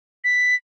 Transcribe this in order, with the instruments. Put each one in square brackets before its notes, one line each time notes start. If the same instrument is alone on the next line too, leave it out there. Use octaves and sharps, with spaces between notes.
[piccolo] B6